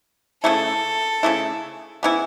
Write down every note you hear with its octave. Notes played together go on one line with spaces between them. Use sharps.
C#3 A3 E4 A4
C#3 A3 E4
C#3 E3 B3 E4